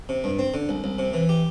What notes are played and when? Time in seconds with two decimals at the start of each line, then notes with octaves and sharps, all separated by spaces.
0.09 C3
0.24 G2
0.39 C4
0.54 D3
0.69 C2
0.84 C2
0.99 C3
1.14 E3
1.29 G4